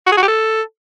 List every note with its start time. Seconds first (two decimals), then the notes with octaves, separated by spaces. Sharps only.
0.06 F#4
0.12 G#4
0.17 F#4
0.23 G4
0.28 A4